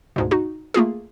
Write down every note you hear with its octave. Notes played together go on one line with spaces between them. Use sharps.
D2 G#2 B2
D#4 F#4
A3 A#3 F4 G#4